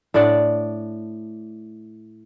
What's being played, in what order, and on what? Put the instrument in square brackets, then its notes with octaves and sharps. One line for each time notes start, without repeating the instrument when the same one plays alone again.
[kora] A2 D4 D5 F#5